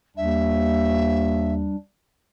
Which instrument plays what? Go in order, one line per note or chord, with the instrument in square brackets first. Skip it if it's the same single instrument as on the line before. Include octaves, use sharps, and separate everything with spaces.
[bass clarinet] D#2 [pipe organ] G3 D4 [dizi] E5